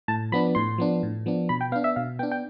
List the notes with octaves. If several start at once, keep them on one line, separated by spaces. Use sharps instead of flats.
A2 A5
F3 B3 D4 B5
A2 C6
F3 B3 D4
A2
F3 B3 D4
B2 B5
G5
B3 D4 F5
E5
B2 F5
B3 D4 G5
G5